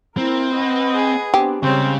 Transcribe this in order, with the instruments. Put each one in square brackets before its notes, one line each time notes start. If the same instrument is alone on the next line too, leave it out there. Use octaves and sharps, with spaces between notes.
[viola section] A#3 E4 A#4 [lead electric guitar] C4
[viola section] B4 D#5 F#5
[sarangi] G#4
[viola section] B3 C4 D4 [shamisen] G4
[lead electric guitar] C#3 [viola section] G3 G#3 C#5 [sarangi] C4